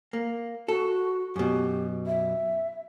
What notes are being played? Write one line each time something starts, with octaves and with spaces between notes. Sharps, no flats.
A#3
F#4 A4
F#2 B2 G4
E5